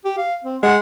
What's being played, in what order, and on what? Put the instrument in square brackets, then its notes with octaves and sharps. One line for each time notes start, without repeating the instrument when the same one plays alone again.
[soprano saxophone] G4
F5
C4
[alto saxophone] G#3 [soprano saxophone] F#5